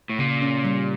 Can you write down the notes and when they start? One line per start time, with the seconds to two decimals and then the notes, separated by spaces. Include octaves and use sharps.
0.09 A2
0.19 A#2 C#3
0.42 C#4
0.65 G3